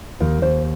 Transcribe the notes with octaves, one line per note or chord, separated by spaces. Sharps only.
D#2 A#4
D#2 C5